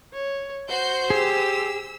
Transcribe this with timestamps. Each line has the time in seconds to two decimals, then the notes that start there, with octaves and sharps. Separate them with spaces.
0.14 C#5
0.69 F#4 C5 G6 C7
1.10 G4 G#4 E6